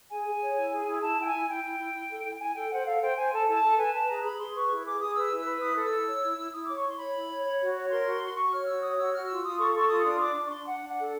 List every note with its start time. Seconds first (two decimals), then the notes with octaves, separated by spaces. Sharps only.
0.11 G#4 G#5
0.26 G#4
0.42 C#5
0.57 E4
0.72 G#4
0.87 E4
1.03 E4 A5
1.19 E4 G5
1.25 G#5
1.34 E4
1.48 E4 G5
1.64 E4
1.79 E4
1.95 E4
2.09 A4
2.25 E4
2.40 E4 G#5
2.55 A4 G5
2.71 C5 F#5
2.86 A4 F5
3.01 C5 G5
3.17 C5 G#5
3.32 A4 A5
3.47 E4
3.55 A5
3.63 A4
3.78 B4 G#5
3.93 B4 A5
4.09 G#4 A#5
4.23 G#4 B5
4.39 G#4 C6
4.55 B4 C#6
4.70 E4
4.85 G#4 D6
5.01 G#4 D#6
5.16 B4 E6
5.31 E4
5.39 E6
5.46 B4
5.61 E4 D#6
5.77 A4
5.85 E6
5.92 E4
6.08 C#5
6.22 E4
6.37 E4
6.53 E4 D#6
6.65 C#5 D6
6.76 C#6
6.84 E4 C6
6.99 C#5 B5
7.14 E4
7.30 C#5
7.45 C#5
7.60 F#4
7.76 C#5
7.91 A#4 C6
8.06 F#4
8.22 F#4
8.37 F#4 C#6
8.52 C#5 F6
8.67 F#4 E6
8.82 C#5 D#6
8.98 F#4 E6
9.13 F#4 F6
9.29 F4 E6
9.44 F4 D#6
9.59 A4 C#6
9.74 A4 C#6
9.89 F4 D#6
10.05 D4 D#6
10.20 D4 D6
10.36 D4
10.45 C#6
10.51 D4 C6
10.66 D4 F#5
10.81 D4
10.89 F#5
10.97 A4